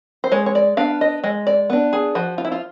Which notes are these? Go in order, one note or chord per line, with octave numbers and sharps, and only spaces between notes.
C5
G#3 C#5
C#5
D5
B3 D4 F5
D#5
G#3 D#5
D5
B3 D4
G#4
F3 F#4
F4
E4
F4